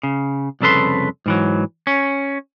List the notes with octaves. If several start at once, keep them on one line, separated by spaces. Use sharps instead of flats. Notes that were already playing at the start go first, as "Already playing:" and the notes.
C#3
C2 F2 C#3 A4 B4 C6
G#2 E3 F#3
C#4